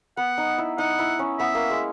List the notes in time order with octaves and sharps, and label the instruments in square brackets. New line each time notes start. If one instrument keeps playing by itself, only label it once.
[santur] B3 [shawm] F#5
[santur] D#4
E4
[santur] D#4 [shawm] F#5
[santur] E4
C#4
[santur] B3 [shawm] E5
[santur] A#3
G#3